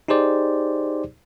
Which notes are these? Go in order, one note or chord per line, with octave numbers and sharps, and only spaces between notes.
D#4 G4 G#4 C5 D5